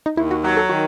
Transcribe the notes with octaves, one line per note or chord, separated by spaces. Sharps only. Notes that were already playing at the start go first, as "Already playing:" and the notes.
D#4
D#2 E4
F#4
F#3 G4
A4
D#3 F#4